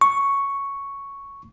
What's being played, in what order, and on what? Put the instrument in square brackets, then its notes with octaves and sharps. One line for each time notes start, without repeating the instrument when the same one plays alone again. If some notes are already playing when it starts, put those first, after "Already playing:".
[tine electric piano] C#6